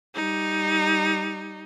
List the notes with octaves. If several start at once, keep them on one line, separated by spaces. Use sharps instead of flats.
G3 D#4